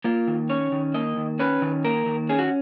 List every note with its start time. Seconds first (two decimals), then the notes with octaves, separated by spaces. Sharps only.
0.04 A#3 F4
0.28 D#3
0.49 C#4 C#5
0.72 D#3
0.94 A#3 D#5
1.17 D#3
1.39 C#4 B4
1.62 D#3
1.85 A#3 A#4
2.06 D#3
2.29 C#4 G#4
2.39 F#4